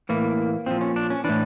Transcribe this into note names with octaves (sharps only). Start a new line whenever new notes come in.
A2 E3 A#3
A#2 F3 C4
C#4
D4
C#4
A2 E3 D4